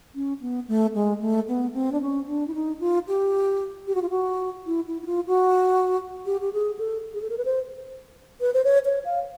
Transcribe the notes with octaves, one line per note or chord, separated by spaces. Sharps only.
C#4
B3
A3
G#3
A3
B3
C4
D4
C#4
D4
E4
D#4
F4
G4
G4
F#4
F4
F#4
E4
E4
E4
F4
F#4
G4
G4
G#4
A4
G#4
A4
A#4
B4
C5
B4
C5
C#5
C#5
F5